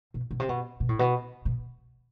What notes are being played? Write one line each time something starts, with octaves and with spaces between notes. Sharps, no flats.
B2
B2
C3
B2
B2
A2
B2
B2